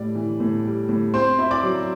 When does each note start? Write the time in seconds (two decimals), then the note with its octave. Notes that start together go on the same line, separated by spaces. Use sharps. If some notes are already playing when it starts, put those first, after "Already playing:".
Already playing: A2 G3 D5
0.15 E3
0.40 A2
0.65 G3
0.89 A2
1.14 C4 C5 C6
1.39 E4
1.51 D5 D6
1.63 F#3